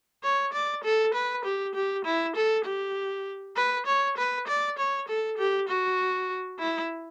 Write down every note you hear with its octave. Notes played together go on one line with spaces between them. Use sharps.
C#5
D5
A4
B4
G4
G4
E4
A4
G4
B4
C#5
B4
D5
C#5
A4
G4
F#4
E4